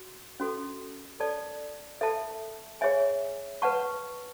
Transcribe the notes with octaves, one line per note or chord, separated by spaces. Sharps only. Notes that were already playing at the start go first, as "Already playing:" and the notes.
Already playing: F#4
C#4 F#4 A4
A4 D5 A5
A4 E5 A5
G#4 C#5 E5 G#5
B4 F#5 A5 C#6